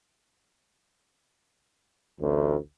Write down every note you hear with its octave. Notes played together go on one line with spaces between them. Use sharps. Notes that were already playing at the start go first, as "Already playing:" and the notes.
A1 D2